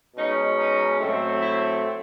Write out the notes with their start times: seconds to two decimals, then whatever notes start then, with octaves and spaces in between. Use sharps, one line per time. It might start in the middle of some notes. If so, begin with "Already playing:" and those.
0.15 B2 G#3 C#4 D#4
0.57 D#4
0.99 A2 F#3 A3 C4
1.40 E4